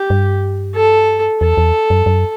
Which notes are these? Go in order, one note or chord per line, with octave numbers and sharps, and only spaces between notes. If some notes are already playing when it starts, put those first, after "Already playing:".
Already playing: G4
G2
A4
E2 A4
E2
F#2
F#2